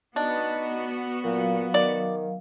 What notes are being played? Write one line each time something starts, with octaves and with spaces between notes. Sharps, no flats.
B3 D4 D#4 F#4
A#2 F#3 F5
D#3 D5